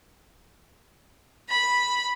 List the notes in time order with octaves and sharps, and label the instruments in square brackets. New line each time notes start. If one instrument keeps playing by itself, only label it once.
[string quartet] B5